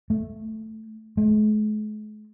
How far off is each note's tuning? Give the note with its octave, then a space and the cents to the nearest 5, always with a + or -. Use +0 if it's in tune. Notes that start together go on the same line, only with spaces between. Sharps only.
A3 +0
G#3 +45